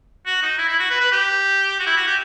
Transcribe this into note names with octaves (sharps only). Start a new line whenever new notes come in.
F#4
D#4
E4
E4
F#4
B4
B4
G4
F#4
E4
F#4
G4